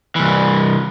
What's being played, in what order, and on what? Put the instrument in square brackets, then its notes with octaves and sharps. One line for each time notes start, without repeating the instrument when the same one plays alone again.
[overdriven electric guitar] C2 E3